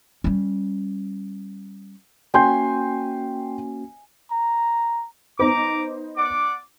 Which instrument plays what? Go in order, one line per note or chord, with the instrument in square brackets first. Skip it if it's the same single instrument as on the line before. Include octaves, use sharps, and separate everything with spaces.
[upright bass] G3 C#4
[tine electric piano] A#3 C#4 F#4 [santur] E5 G#5 [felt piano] G5 C6 G6
[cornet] A#5
[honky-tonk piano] B3 D#4 C5 [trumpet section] A#5 D6
[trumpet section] D5 F#5 D6